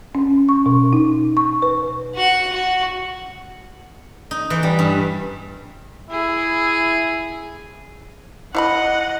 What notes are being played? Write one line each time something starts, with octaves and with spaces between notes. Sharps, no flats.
C#4
C#6
B2
D#4
C#6
B4
F#4 F#5
F#4
D#4
E3
G3
G2
E4 G#4
E4 D#5 F5 F#5 B5